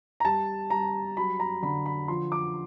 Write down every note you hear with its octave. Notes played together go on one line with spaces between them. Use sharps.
A#5
G3 A5
G3 A#5
F#3 B5
A#5
D3 B5
B5
F3 C6
D6